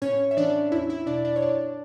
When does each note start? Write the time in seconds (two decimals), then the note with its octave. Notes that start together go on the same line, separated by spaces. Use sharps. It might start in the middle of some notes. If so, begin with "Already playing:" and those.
0.02 A2 C#4 C#5
0.31 E5
0.37 E3 D4 D5
0.72 E2 E4 E5
0.90 E4 E5
1.07 B2 D4 D5
1.25 D4 D5
1.36 C#5
1.42 F#2 D4 D5